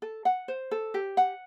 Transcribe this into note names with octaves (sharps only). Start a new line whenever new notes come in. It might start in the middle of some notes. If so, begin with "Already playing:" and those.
A4
F#5
C5
A4
G4
F#5